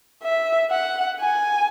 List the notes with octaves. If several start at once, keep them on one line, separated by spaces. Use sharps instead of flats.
E5
F#5
G#5